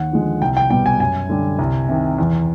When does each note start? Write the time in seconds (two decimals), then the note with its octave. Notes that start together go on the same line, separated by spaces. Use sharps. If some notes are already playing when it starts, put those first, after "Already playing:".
Already playing: D#2 F#5
0.12 D3 F3 G#3
0.41 C2 G5
0.57 G5
0.70 B2 G3 G5
0.86 G#5
1.00 F#2 G#5
1.29 D3 G3
1.59 C2
1.89 C3 D#3
2.18 E2